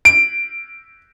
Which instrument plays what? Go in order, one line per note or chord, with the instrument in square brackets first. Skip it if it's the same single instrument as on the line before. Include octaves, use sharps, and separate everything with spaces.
[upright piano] D7